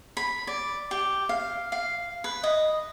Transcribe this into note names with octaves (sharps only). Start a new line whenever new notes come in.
B5
D5
G4
F5
F5
B4
D#5